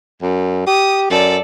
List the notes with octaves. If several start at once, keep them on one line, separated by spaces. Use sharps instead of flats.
F#2
G4 D#6
F#2 A4 D5